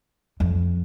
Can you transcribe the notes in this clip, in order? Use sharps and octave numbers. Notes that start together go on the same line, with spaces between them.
F2